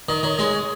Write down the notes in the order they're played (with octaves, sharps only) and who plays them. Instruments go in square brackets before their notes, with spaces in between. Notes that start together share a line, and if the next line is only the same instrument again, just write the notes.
[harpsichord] D#3 [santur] D#5
[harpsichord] D#3 [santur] C#5
[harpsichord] G#3 [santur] D#5
[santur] C#5